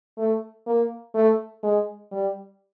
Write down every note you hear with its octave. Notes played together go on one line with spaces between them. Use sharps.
A3
A#3
A3
G#3
G3